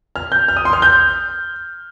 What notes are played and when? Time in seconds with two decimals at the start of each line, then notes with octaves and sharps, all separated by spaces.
0.16 F6
0.32 G6
0.48 F6
0.57 D#6
0.65 C6
0.73 F6
0.82 G6